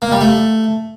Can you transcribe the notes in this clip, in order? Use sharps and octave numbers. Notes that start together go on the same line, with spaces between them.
A#3
G3
A3